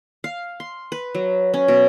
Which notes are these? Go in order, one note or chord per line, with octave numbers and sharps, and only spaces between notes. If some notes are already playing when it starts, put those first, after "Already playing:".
F5
C6
B4
F#3
C#4
B2